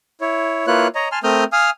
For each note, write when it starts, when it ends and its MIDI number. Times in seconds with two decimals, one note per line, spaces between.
0.21 0.67 64
0.21 0.67 73
0.67 0.88 58
0.67 0.88 64
0.67 0.88 65
0.67 0.88 71
0.67 0.88 73
0.67 0.88 90
0.95 1.08 73
0.95 1.08 75
0.95 1.08 82
1.12 1.19 80
1.12 1.19 81
1.12 1.19 84
1.12 1.19 89
1.24 1.44 57
1.24 1.44 60
1.24 1.44 70
1.24 1.44 87
1.24 1.44 89
1.24 1.44 91
1.53 1.70 77
1.53 1.70 80
1.53 1.70 87
1.53 1.70 89